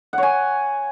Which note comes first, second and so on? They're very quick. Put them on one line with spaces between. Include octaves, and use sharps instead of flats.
F#5 C#5 G#5